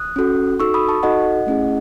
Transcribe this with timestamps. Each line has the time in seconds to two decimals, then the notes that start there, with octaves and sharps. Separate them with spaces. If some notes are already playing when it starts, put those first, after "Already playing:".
Already playing: D#6 F#6
0.16 C#4 F#4 A4
0.60 D#4 F#4 A4 C#6 E6
0.74 B5 D#6
0.89 A5 C#6
1.03 D#4 F#4 A4 D#5 F#5
1.47 A3 C#4 E4 G#4